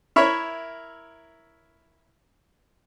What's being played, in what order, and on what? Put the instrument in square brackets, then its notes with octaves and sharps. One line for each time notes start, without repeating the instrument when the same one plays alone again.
[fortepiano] E4 A#4 C#5 E5 B5 E6